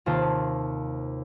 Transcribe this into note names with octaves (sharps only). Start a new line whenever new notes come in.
D#2 C3 F4 C5 A5